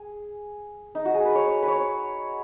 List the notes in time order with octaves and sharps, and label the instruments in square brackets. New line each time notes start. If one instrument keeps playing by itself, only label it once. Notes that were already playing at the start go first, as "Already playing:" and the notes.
Already playing: [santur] G#4
D#4
F#4
G#4
B4
C#5
B4
C#5